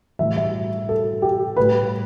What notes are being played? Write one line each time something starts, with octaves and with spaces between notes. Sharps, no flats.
A2 E3 G3 E5
E5
A4
G4
A2 G3 B4